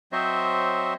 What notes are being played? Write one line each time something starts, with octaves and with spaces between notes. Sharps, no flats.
F#3 C4 C5 C#5 D#5 E5